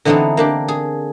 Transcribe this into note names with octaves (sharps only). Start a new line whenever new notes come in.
D3 E3 B3 C4 D#4 A4
A#3 D4 G4
G#4